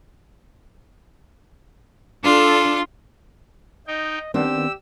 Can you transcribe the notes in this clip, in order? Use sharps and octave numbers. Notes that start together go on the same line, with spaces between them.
D4 F4 A4
D#4 D#5 G5
D#3 B3 C4 D4 G4 E6